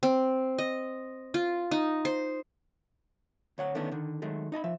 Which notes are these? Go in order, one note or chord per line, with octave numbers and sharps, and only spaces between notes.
C4
D#5
F4
D#4
C5
D2 C#5 F#5
D3 D#3 A3 B3 C#4 D4
D3 D#3
D#3 F#3 G#3 A3
D#4 D#5 A5 B5
F3 E5